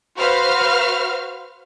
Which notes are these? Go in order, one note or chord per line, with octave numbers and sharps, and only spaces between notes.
F#4 B4 C5 F5 F6